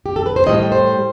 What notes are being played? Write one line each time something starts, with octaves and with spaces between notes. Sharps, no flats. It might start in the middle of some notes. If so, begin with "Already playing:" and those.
G4
A4
B4
C5
A2 G3 D#5
C5